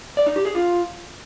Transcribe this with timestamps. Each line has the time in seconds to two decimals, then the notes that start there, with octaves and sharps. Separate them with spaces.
0.17 D5
0.26 D#4
0.36 G4
0.45 G#4
0.55 F4